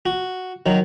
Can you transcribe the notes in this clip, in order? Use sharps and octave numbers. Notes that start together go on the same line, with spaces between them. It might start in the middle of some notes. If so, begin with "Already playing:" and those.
F#4
D#3 F#3